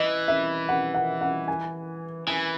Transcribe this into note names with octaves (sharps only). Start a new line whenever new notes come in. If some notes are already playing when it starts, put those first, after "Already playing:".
Already playing: E3 D#5
E5
F#5
F#5
F#5
G#5
E3 G#5